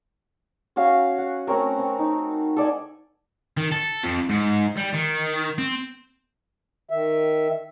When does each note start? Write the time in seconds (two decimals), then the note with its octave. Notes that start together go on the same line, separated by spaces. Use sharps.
0.76 C#4 F#4 F5 G#5
1.18 F#5
1.47 A3 C4 C#4 A#4
1.79 C4
1.99 D#4
2.56 A4 D5 D#5 G#5
3.57 D#3
3.72 A4
4.03 F2
4.29 G#2
4.77 G3
4.94 D#3
5.58 C4
6.90 D#3 E5